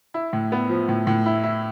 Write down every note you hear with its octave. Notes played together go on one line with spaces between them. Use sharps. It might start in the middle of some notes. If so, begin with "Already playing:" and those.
E4
A2
B3
F3
A2
A2
E4
E4